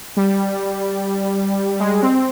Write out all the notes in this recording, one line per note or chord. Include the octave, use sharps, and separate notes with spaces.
G3
G#3
C4